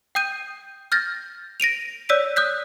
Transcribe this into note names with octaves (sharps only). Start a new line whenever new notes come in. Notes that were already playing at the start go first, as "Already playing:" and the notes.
G5 D#6 G6 D#7
F6 G6 A6 A#6
A#6 D7 D#7 F7
C#5 D5 E6 B6 D#7
D#6 F#6 G6 B6